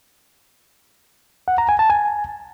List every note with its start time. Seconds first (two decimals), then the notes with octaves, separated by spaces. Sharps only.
1.48 F#5
1.58 A#5
1.69 G#5
1.79 A5
1.90 G#5